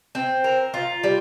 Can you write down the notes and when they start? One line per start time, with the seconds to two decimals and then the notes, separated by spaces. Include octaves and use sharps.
0.15 C4
0.44 A#4
0.74 F4
1.04 G3